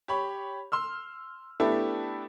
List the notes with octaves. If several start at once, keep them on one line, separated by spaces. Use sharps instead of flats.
G4 C#5 B5
C6 E6 F6
A3 B3 D4 E4 G4 A4